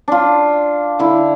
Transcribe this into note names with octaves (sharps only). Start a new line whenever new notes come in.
D4 F4
D3 E4